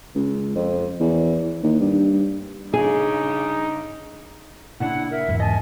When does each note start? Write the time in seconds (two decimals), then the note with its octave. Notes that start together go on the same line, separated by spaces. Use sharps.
0.15 C#2
0.55 F2
1.00 E2
1.63 D#2
1.81 G2
2.74 G2 C#3 G3 D#4 G#4
4.80 A#2 C#3 D4 E4 F#5
5.11 A#4 E5
5.28 E2 G#2 E3
5.40 D#5 G#5 A5